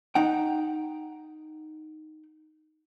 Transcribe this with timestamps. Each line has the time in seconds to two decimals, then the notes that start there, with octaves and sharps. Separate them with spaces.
0.15 D#4 F#5 G5